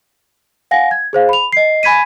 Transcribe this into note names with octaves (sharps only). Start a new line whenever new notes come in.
F5 F#5 G#5 A#6
G#6
G#4 C5 F5
B5 F7
D#5 C7
G#5 B5 G#6 B6 D#7